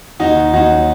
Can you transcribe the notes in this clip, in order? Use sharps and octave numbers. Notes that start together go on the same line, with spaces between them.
D#2 D#4 F#4
D#3
D#2 D#4 F#4
F#3